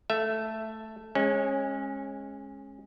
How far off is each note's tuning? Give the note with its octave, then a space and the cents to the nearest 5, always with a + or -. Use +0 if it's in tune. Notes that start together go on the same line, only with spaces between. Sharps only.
A3 +0 E5 +10
G#3 +0 C#4 -25